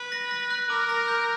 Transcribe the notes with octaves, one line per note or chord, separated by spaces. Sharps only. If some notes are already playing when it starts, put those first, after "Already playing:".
Already playing: B4
A#6
A#6
F#6
A#4 D6
A#6
G6